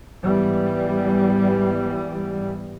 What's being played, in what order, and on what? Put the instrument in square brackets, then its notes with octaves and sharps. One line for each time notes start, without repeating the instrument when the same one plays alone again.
[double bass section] G#2 E3 G3 B3